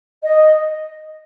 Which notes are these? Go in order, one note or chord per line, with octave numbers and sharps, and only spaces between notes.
D#5